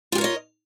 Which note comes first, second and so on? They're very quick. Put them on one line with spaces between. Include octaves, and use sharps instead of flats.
F4 G4 A#4 C#5 D#5